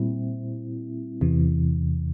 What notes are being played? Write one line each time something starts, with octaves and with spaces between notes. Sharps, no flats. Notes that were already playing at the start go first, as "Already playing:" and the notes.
Already playing: A#2 G3 C4 E4
E2 C3 E3